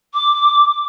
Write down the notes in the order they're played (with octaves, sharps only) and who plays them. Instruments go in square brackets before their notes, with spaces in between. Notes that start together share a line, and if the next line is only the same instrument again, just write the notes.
[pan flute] D6